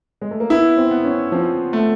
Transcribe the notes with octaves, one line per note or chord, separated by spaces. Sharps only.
G#3
A3
A#3
B3 E4
C4
B3
C#4
F3 C4
A3